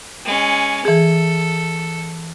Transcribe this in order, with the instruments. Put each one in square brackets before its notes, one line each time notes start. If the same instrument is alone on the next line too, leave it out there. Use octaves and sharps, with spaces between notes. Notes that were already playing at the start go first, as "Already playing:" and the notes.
[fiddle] G#3 C#4
[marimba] E3 G#4 [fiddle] A4